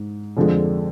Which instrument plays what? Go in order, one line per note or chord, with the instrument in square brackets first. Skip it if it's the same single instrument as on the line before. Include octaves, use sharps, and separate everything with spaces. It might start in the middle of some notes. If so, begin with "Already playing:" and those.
Already playing: [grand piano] G#2
F2 D3 F3 G#3